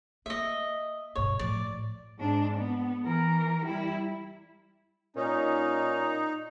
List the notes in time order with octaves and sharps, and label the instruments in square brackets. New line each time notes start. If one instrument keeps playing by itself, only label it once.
[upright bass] A#3 [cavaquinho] D#5 E5
[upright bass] G2 B2 [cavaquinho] C#5
[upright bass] A2 F3 [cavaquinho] D5
[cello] G#2 D4
B3
E3 A#4
G3 E4
[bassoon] A#2 [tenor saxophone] C#4 [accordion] D#4